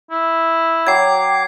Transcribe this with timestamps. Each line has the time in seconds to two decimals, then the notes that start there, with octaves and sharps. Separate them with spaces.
0.11 E4
0.87 F#3 G5 D6 G#6 C7